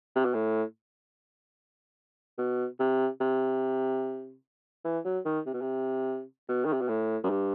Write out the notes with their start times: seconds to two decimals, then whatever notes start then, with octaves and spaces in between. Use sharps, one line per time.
0.15 C3
0.25 B2
0.34 A2
2.38 B2
2.79 C3
3.20 C3
4.84 E3
5.05 F#3
5.25 D#3
5.46 C3
5.54 B2
5.61 C3
6.48 B2
6.65 D#3
6.73 C3
6.81 B2
6.89 A2
7.23 F#2
7.30 G2